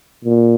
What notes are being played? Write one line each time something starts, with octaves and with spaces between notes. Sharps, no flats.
A#2